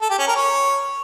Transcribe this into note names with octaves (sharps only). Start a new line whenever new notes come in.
A4
G4
C#4
A#4
C#5